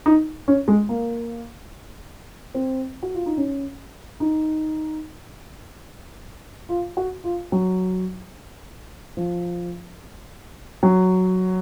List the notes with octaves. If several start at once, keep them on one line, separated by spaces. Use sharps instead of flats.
D#4
C#4
G#3
A#3
C4
F#4
F4
D#4
C#4
D#4
F4
F#4
F4
F#3
F3
F#3